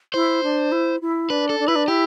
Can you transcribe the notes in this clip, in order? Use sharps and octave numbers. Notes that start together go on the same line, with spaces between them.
E4 C5
D4
E4
E4
D4 B4
A4
D4
E4 B4
D4
E4 G4